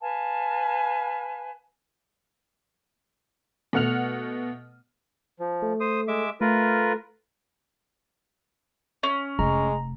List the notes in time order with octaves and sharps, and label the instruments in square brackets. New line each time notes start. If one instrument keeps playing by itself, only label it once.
[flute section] B4 F5 G#5 A5
[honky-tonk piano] B2 A3 F#5 F6 F7
[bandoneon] F3
[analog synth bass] A3
[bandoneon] C5 D#6
G#3 E5 D6
[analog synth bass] A3 [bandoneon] F4 A#4 B4
[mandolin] C#4
[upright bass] F1 [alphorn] G#3 [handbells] A#5